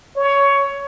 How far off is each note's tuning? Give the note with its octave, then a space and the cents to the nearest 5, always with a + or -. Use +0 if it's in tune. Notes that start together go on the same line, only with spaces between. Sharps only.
C#5 +15